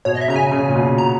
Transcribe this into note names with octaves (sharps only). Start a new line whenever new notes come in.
B2 C#5
D#5
E5
C#3 A#5
G#5
C#3
A#2
B2
A#5